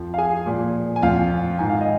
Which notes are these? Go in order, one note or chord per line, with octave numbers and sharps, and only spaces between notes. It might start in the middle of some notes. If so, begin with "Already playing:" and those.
Already playing: F2 F3
F5
G#4 G#5
A#2 F3
G#5
F2 F3 F4 F5
G#2 D#3 G#5
F5
D#5